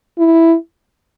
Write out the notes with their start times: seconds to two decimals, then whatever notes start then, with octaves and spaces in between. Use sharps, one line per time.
0.18 E4